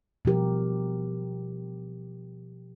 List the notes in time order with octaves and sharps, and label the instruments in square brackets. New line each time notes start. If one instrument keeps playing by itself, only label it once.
[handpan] B2 F3 G4 A#4